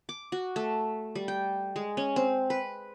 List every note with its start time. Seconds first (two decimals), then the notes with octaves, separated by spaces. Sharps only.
0.09 D6
0.32 F#4
0.56 A3
1.15 G3
1.28 G5
1.76 G#3
1.97 C#4
2.16 C4
2.50 B4